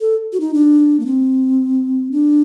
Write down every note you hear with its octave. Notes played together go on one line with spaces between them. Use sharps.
A4
F#4
D#4
D4
A#3
C4
D4